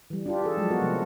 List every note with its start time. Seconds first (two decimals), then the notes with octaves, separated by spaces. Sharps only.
0.10 E3 G3
0.26 D4 F4 G4
0.42 F4 G#4 A4
0.57 F3 F#3 G#3
0.70 B3 F#4 A#4
0.82 C3 F3 A3